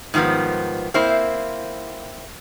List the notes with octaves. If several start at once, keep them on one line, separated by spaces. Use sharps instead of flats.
G#2 D#3 F3 G3 B3
A#3 C4 E4 C5